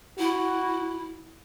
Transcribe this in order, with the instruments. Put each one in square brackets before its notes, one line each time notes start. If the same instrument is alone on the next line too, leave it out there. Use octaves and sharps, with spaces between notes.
[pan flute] E4 [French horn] F#4